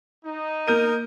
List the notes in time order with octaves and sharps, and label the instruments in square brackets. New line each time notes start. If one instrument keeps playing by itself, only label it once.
[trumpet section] D#4
[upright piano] A#3 G6 D#7 [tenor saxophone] A#4